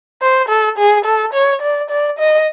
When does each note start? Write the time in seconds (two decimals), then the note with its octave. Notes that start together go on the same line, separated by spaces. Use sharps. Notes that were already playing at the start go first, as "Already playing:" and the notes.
0.22 C5
0.49 A4
0.78 G#4
1.05 A4
1.34 C#5
1.62 D5
1.90 D5
2.19 D#5